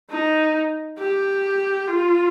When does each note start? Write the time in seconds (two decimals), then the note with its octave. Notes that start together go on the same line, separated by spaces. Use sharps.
0.11 D#4
0.99 G4
1.88 F4